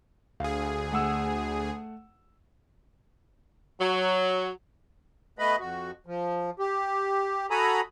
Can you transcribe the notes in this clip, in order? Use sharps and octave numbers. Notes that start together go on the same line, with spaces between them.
D2 G#4 F5
A3 F#5 E6
F#3
A3 B3 B4 D#5 B5
F2 F#4
F3
G4
F#4 A4 G#5 A#5 B5 D#6